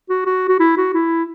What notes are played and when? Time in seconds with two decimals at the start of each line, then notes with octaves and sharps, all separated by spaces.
0.09 F#4
0.26 F#4
0.49 F#4
0.60 E4
0.77 F#4
0.94 E4